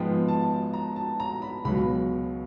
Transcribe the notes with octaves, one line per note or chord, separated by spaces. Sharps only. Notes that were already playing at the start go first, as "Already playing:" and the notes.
Already playing: G#1 G#2 F3 G#3 B3 G5
A5
A#5
A5
A#5
B5
C#2 B2 F#3 B5